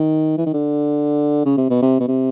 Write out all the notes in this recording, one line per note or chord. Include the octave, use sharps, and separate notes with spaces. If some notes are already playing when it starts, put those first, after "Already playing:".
Already playing: D#3
E3
D#3
D3
C#3
C3
B2
C3
B2
C3